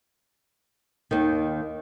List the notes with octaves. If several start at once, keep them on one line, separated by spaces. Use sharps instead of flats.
D#2 D#3